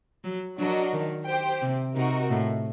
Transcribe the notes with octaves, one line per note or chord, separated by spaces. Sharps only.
F#3
F#3 D4 F#4 A#4 D#5
D#3
G4 C5 G5
C3
C3 D#4 F#4 A#4
A2